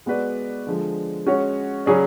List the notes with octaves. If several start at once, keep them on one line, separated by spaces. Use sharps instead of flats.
G#3 B3 F#4 B4 D5
D3 F3 G#3
G#3 C#4 F#4 C#5
C#3 F#3 C#4 G#4 D5